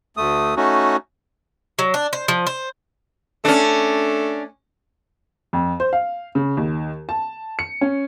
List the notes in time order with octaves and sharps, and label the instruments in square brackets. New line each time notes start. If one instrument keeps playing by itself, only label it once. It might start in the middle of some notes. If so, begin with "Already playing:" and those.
[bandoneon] D2 A3 D#6
A3 C#4 D#4 F#4
[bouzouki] F#3
D4
C5
F3
C5
[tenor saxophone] A3 [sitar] C#4 D4
[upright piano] F2
C5
F5
C#3
D#2
A5
C#7
C#4